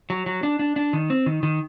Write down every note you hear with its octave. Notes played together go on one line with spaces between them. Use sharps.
F#3
F#3
D4
D4
D4
D#3
C4
D#3
D#3